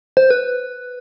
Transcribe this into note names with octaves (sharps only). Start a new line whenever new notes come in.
C5
B4